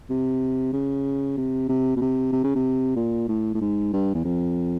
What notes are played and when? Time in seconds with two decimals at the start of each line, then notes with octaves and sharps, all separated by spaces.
0.10 C3
0.73 C#3
1.38 C3
1.69 C3
1.97 B2
2.01 C3
2.32 C3
2.44 C#3
2.55 C3
2.96 A#2
3.29 A2
3.55 A2
3.61 G#2
3.93 G2
4.14 E2
4.25 F2